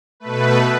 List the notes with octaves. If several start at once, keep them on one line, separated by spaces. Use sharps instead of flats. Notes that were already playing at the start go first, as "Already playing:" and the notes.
B2 A3 B4